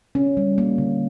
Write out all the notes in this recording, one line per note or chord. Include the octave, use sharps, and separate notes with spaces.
C#4
G3
A#3
D3